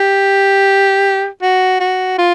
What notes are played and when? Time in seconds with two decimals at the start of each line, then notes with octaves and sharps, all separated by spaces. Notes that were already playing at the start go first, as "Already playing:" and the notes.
Already playing: G4
1.42 F#4
1.80 F#4
2.18 F4